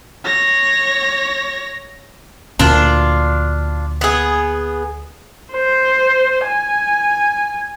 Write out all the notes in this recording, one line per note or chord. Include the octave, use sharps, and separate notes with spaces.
C#5 A#6
D2 A#2 D4 F4
B3 G#4
C5
G#5